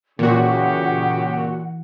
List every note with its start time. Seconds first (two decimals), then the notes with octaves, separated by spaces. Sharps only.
0.19 A#2 C#3 E3 F#4 G4 F#5